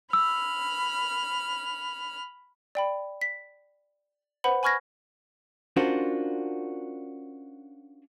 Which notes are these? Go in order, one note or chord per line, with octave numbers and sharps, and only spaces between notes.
B5 E6 F6
D5 G5 B5
B6
B4 C5 F#5 B5
G#5 B5 C#6 F6 G#6 A#6
C#4 D4 F4 F#4 A#4 C5